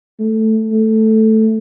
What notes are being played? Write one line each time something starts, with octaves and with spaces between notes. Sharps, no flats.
A3
A3